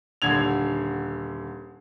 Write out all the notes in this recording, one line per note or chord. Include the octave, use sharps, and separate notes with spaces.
D#1 D3 G#6 F7